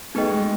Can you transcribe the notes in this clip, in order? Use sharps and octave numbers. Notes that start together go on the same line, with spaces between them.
A3 D#4 G#4 B4 D#5 G5
G#3